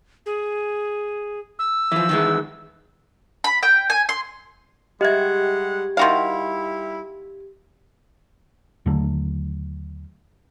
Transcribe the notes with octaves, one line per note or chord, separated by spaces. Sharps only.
G#4
E6
E3 F3
D#3 E3 G#3
B5
G5
G#5
C6
G3 G#3 G4 D#5 E5 F#5 G#6
D#3 G3 E4 F#4 E5 F5 C6
D#2 D3 F#3 A3